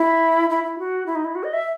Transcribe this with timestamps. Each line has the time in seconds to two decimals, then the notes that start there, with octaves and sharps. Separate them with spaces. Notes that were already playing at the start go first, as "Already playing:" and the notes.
Already playing: E4
0.50 E4
0.64 E4
0.79 F#4
1.06 E4
1.15 D#4
1.25 E4
1.35 F#4
1.44 D#5
1.53 E5